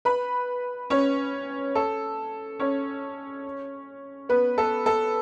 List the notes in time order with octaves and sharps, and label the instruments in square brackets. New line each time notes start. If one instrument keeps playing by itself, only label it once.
[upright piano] B4 B5
C#4 C#5
A4
C#4 C#5
B3 B4
A4
A4